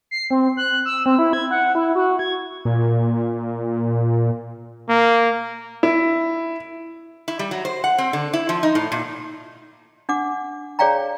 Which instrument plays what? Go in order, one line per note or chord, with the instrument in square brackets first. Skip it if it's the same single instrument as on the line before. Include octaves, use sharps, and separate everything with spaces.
[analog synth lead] C7
C4
F#6
E6
C4
E4
G#6
F#5
E4
F#4
G#6
[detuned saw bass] A#2
[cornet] A#3
[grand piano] E4
[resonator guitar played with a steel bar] E4
G3
F#3
C5
F#5
C4
D3
E4
F3
D#4
A2
A#2
[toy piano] D4 F#5 D6
G#4 C#5 D5 F5 G5 A#5